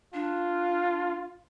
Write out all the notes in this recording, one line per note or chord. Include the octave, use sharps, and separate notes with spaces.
D4 F4